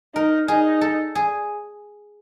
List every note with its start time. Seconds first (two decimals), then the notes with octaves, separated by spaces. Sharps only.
0.15 D#4 A#4
0.48 D#4 G#4
0.81 A4
1.15 G#4